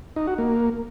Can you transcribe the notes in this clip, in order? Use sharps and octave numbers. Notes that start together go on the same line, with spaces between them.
D#4
F#4
A#3